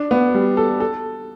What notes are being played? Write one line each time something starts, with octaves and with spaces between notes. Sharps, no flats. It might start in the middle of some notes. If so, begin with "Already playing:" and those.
Already playing: D4
B3
G3
A4
A4